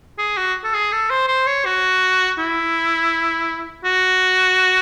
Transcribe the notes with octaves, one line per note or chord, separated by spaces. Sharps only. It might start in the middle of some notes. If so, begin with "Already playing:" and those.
G#4
F#4
A4
G#4
A4
C5
C5
C#5
F#4
E4
F#4